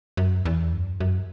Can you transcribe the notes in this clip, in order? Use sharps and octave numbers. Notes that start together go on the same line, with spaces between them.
F#2
E2
F#2
F#2